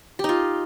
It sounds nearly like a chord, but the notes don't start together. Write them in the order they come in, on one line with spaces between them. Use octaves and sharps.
G4 D#4 F4